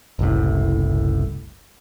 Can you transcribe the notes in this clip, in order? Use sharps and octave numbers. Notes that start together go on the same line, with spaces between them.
F#1 C2 A2